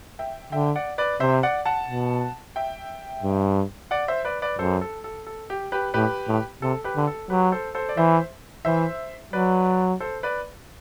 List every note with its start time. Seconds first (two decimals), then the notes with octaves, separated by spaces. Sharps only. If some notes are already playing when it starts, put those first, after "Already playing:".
0.19 E5 G5
0.52 D3 E5 G5
0.75 D5 F#5
0.98 B4 D5
1.20 C3 C5 E5
1.43 D5 F#5
1.66 F#5 A5
1.88 B2
2.56 E5 G5
3.23 G2
3.91 D5 F#5
4.08 C5 E5
4.25 B4 D5
4.42 B4 D5
4.59 F#2 A4 C5
4.81 A4
5.04 A4
5.27 A4
5.50 G4
5.72 G4 B4
5.94 A2 G4 B4
6.28 A2
6.62 C3 A4
6.84 G4 B4
6.96 D3
7.07 A4
7.30 F#3 G4 B4
7.52 A4 C5
7.75 A4 C5
7.89 D5
7.97 E3 C5 E5
8.65 E3 C5 E5
9.33 F#3 B4 D5
10.00 A4 C5
10.23 B4 D5